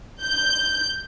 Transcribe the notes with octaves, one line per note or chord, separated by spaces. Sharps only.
G6